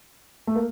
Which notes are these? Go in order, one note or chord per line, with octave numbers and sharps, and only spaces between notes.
A3
A#3